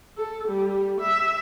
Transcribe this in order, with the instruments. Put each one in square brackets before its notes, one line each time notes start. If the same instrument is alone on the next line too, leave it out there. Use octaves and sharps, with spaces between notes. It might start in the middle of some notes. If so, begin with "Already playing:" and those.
[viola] A4
G3
E5